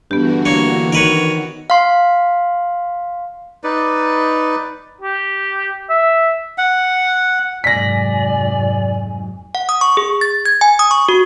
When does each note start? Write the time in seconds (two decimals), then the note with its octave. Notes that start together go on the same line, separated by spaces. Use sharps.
0.11 G2 D3 E3 B3 F#4 G4
0.45 A#3 C#5
0.93 D#3 A#4 B4 C#5
1.70 F5 C6
3.64 D#4 B4 D5
5.01 G4
5.89 E5
6.58 F#5
7.64 F1 G#2 F#3 D5 G#5 A#6 B6
9.55 F#5
9.69 D#6
9.81 C#6
9.97 G#4
10.21 A6
10.46 G#6
10.61 G#5
10.79 D#6
10.91 C#6
11.09 F#4